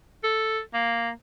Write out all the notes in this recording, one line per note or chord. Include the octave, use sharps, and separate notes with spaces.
A4
A#3